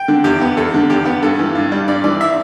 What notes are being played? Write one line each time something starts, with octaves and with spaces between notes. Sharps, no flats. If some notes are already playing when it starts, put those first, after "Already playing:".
Already playing: G5
D3
E2 G4
B3
E2 A4
D3
E2 G4
B3
G2 A4
E3
G2
G3
G2 D5
E3 D5
E5